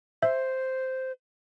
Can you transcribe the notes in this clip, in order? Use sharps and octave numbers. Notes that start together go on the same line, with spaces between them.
C5 E5 G6